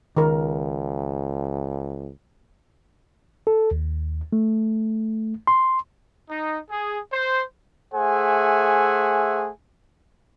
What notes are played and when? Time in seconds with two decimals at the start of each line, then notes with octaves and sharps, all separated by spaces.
0.17 C#2 D#3 A#4
3.47 A4
3.71 D#2
4.33 A3
5.47 C6
6.30 D#4
6.69 G#4
7.12 C5
7.94 A3 G#4 C5 E5 F#5 G#5